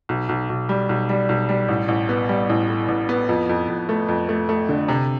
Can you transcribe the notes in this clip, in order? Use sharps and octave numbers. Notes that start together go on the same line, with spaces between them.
B1
B1
B1
G3
B1
G3
B1
G3
A1
A1
B3
G3
A1
A2
A1
B3
F2
F2
F2
A3
F2
A3
A3
D3
C3